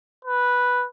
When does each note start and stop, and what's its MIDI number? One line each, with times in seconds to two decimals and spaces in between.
0.25 0.85 71